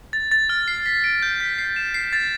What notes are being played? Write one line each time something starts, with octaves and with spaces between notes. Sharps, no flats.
A6
A6
F6
C7
B6
D7
G6
B6
C7
E7
C7
A6